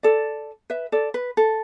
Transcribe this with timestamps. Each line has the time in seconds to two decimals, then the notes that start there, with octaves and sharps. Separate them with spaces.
0.03 A4 D5
0.70 B4 E5
0.92 A4 D5
1.14 B4
1.37 A4